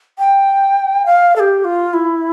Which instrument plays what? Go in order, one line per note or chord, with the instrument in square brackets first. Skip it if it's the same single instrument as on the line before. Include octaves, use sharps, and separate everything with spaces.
[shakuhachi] G5
F5
A4
G4
F4
E4